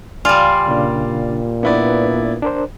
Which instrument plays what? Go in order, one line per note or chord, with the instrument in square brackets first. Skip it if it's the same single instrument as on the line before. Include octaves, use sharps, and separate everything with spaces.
[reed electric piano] C#2 G#5 [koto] G3 F4 [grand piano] D5 F5
[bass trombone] A#2 [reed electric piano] C#3 D4
[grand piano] B3 E4 D5 [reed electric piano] D4 B4
[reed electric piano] D4 A#4 C5